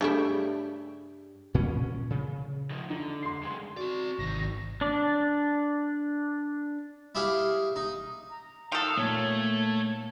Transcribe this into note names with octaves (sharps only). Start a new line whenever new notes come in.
G2 C#3 G3 A3 E4 G5
A#2 C#4
C#3
F3 D#4
D3 D#4
C6 C7
G2 C#3 G#3
C4 F#4 D5
G#1 C3 D#3 A#6
D4 D5
E4 G4 G#4 C#5 F5
D#4
A#5
D#3 A4 F5 D#6
A#2 A3 C#5